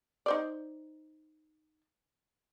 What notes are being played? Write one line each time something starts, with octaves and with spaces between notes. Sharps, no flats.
D#4 C5 D5